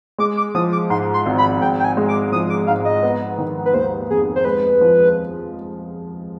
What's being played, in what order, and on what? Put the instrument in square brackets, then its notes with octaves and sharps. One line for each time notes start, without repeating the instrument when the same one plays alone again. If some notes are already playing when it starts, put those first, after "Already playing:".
[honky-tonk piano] G#3 [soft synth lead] D6
[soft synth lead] D6
[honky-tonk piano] F3 [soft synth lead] D#6
[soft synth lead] D6
[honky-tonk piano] G#2 [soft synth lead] C6
[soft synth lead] C6
[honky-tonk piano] G#1
[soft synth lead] B5
[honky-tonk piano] G#2 [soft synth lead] G5
[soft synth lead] G5
G#5
[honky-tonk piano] G#3
[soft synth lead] D6
[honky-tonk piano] F3 [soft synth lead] D#6
[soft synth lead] D6
[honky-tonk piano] G#2 [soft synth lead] F5
[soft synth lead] D#5
[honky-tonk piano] B3
D#3
[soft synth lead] B4
[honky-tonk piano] D#2 [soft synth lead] C5
[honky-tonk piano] F1 [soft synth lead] G#4
[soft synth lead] C5
[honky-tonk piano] G#3 [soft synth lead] B4
[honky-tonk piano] F3